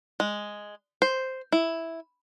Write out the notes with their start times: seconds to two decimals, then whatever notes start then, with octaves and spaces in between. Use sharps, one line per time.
0.20 G#3
1.02 C5
1.52 E4